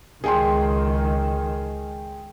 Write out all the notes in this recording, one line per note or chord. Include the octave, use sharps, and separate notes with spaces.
C#2 D#3 G#4 G5 C6